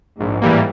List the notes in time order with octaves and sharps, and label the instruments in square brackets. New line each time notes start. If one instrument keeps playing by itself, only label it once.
[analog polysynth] A#1 [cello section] G#2
[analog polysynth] A2 E3 G3 A#3